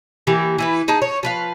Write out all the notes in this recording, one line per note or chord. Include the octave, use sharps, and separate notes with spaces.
E3 A#3 G4
E3 E4 B4
D#4 G#4 A5
C#5
F3 B4 F5